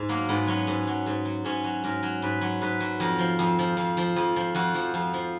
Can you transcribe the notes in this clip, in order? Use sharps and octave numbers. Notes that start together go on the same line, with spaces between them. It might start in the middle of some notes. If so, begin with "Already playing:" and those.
Already playing: G#2
F#3 A#3
G#2 B3
F#3 C#4
G#2
F#3
G#2
F#3
G#2 C#4
F#3
G#2 A#4
F#3
G#2 B4
F#3
G#2 B4
F#3
F2 A#4
F3
F2
F3
F2
F3
F2
F3
F2 F#4
F3
F2
F3